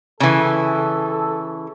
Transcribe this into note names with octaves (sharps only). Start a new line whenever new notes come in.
C#3 E3 A4